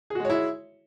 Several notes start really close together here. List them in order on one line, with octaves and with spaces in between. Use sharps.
G#4 F#4 G#3 C#5 E4